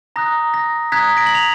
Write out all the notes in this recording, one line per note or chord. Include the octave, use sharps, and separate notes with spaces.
A#5 D#6 F#6 A#6
A#6
A#5 D#6 F#6 G#6 B6
A#6 D7
F#7
F7